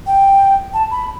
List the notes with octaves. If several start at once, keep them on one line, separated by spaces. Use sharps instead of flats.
G5
A5
B5